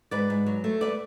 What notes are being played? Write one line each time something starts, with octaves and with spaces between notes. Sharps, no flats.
G#2 B4 D5
G#2
F#3
A3
B4 D5